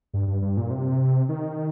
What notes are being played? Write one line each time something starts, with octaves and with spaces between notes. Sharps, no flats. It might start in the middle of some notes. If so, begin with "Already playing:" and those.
G2
G2
G2
A#2
C3
D#3